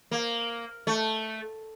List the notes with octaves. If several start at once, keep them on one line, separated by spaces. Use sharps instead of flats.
A#3
A3